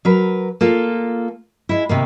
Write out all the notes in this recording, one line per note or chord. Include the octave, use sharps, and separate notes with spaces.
F#3 A#4 B4
A#3 F4 A4
G#3 E4
C3 D#3 A#3